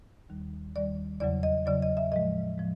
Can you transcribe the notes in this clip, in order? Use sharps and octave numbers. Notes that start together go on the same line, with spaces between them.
D#2 D#3 G3
D#2 D#3 G3 D5
E2 C#3 F#3 D5
D#5
E2 C#3 F#3 D5
D#5
E5
A2 F3 G#3 D#5
A2 F3 G#3